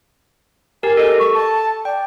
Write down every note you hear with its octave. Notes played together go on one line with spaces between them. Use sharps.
G4 A#4 G#5
A4 D#5
C#6
A5
D5 G5